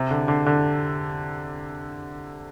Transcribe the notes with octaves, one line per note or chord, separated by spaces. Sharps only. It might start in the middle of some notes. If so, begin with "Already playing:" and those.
Already playing: C3
D3
D3
D3